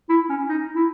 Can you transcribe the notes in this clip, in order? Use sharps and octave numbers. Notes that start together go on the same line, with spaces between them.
E4
C#4
D#4
E4